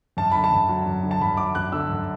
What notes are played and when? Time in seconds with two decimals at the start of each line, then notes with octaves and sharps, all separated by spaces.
0.17 F#2 A5
0.31 D3 B5
0.44 A5
0.52 F#2
0.69 F#3
0.86 F#2
1.03 D3
1.11 A5
1.21 F#2 B5
1.37 F#3 D6
1.55 F#2 F#6
1.72 D3 E6
1.89 F#2